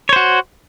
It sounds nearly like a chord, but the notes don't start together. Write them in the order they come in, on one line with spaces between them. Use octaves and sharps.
C#5 C5 F#4